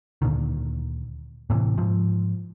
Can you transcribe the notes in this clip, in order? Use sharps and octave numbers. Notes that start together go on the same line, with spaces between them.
D2 A#2 D3 D#3
A2 C3 D#3 E3
G#2 F3